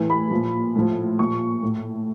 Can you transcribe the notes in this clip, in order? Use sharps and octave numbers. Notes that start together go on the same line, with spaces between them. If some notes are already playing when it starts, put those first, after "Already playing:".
Already playing: A2 E3
B5
A#2 F3
A2 F3
A#2 F3 C#6
A2